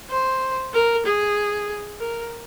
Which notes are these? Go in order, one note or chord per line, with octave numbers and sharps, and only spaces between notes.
C5
A#4
G#4
A#4